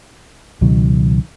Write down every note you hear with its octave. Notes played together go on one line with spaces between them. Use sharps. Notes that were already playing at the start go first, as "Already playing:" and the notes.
C#2 B2 D#3 F#3